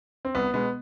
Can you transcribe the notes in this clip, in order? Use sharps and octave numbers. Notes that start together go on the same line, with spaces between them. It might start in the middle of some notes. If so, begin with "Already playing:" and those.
C4
C2 B3
B2 G#3 B3